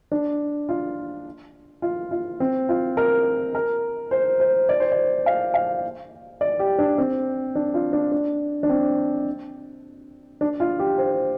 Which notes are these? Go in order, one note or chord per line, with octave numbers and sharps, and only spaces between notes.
D4
F4
F4
F4
C4
F4
A#4
A#4
C5
C5
D5
C5
D5
F5
F5
D5
G4
D4
C4
D4
F4
D4
D4
D4
C4
D4
F4
G4
C5